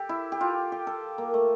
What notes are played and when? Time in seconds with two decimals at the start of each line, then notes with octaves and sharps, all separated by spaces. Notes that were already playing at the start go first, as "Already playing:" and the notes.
Already playing: G4 A4
0.09 E4
0.32 G4
0.41 F4
0.72 G4
0.87 A4
1.18 A#3
1.34 A3